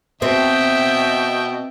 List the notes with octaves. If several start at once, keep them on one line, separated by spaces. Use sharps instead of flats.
B2 C4 D#5 E5 G5